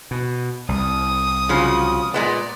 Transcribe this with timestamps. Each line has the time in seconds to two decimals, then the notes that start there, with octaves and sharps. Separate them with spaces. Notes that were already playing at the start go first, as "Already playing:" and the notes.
0.11 B2
0.69 C2 D#6
1.49 C#3 F3 F#3
2.14 A#2 G#3 B3 D5